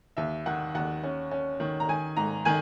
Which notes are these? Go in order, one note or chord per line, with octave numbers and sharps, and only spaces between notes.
D#2 E5
D#3 F#5
D#2 F#5
C#4
C#4
D#3
A#5
D#3 G#5
G#2 A#5
D#3 G#5